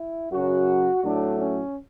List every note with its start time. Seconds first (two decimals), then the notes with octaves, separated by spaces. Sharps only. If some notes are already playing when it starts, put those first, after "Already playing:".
Already playing: E4
0.31 F#2 C#3 F#3 F#4
1.03 A2 F#3 A3 D4
1.39 C#4